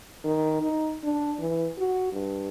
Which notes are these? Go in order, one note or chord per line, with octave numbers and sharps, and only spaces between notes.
D#3
D#4
D4
E3
F#4
G2